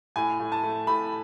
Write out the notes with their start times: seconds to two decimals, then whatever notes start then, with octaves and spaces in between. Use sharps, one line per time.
0.16 A2 G#5
0.40 A2
0.52 A5
0.63 A3
0.87 A2 B5